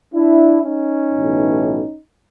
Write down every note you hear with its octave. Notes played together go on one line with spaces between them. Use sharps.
D4 E4
C#4 D#4
B1 A2 E3